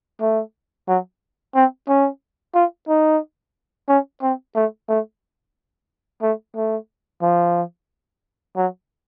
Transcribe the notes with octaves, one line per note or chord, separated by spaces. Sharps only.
A3
F#3
C4
C#4
F4
D#4
C#4
C4
A3
A3
A3
A3
F3
F#3